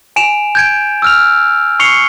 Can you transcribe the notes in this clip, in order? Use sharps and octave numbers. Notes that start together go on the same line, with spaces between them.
G#5 D7 E7 F7
G6 G#6 D7
E6 F6 F7
C#6 C7 C#7 F7 G7